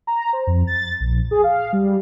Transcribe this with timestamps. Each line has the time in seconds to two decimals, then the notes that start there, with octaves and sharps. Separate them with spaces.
0.07 A#5
0.33 C5
0.47 F2
0.67 A6
1.00 A#1
1.31 G#4
1.44 F5
1.73 G3